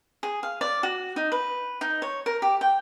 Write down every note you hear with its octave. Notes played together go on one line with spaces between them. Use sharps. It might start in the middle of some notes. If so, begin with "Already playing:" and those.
G#4
F5
D5
F#4
D#4
B4
D#4
C#5
A#4
G4
G5